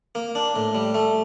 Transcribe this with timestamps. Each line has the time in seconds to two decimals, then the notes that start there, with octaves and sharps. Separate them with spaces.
0.15 A#3
0.35 D4
0.56 A2
0.75 G3
0.94 A3